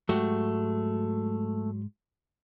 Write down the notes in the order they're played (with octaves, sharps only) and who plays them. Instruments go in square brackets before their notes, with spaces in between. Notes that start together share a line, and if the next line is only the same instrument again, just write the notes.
[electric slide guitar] G#2 G#3 [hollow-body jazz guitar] F#3 F#4 G4 [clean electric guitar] A3